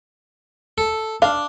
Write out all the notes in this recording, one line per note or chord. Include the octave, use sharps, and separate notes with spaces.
A4
D4 F5